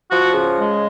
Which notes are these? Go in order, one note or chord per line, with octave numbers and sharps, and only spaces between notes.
F3 F#4
C#3
G#3